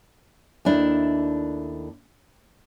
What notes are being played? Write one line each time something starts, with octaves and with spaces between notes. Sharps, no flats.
D#2 A3 D4 E4